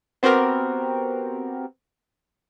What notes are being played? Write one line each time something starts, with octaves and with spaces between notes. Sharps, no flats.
B3 C4 F#4 G4 A#4